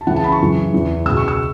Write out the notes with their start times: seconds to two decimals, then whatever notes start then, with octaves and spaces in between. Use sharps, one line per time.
0.01 A5
0.07 C#2 C#3 E3 F#5
0.16 A5
0.24 B5
0.32 C#6
0.40 F#2 C#3 E3
0.73 E2 E3
1.05 C#2 E6
1.10 B2
1.17 C#6
1.28 E6